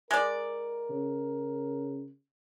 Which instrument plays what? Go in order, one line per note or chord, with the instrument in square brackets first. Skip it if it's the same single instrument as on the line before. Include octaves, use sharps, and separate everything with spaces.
[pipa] G#3 D5 [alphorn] A#4
[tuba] C#3